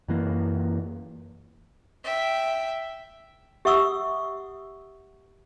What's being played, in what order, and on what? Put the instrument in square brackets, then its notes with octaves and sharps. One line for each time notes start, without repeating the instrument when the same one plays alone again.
[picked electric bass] F#2 E3 A#3
[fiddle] E5 G5
[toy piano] G4 E5 F#5 C#6 D#6 E6